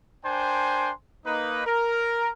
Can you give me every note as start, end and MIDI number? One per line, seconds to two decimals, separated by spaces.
0.25 0.90 62
0.25 0.90 70
0.25 0.90 72
0.25 0.90 79
0.25 0.90 80
0.25 0.90 84
1.26 1.65 58
1.26 1.65 63
1.26 1.65 71
1.66 2.30 70